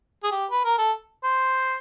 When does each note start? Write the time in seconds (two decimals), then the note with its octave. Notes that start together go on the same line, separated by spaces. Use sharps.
0.24 G#4
0.32 G4
0.51 B4
0.65 A#4
0.78 A4
1.24 C5